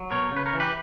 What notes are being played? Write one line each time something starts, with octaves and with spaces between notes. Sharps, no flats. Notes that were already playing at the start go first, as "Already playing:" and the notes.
Already playing: F#3
B2 A#4 C#5
C#3
B4
A#4 C#5
E3
G4 B4